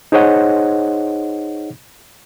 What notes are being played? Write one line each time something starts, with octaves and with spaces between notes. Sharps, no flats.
D#4 G#4 C5 C#5 D#5 F#5